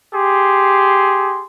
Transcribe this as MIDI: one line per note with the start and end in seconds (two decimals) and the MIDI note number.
0.13 1.43 67
0.13 1.43 68
0.13 1.43 84